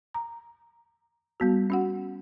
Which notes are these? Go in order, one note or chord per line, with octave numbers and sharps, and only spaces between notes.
A#5
G3 B3 F#4
C#4 F#4 F#5